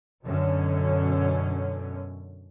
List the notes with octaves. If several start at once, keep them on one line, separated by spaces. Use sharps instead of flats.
F#2 B2 D3 C#4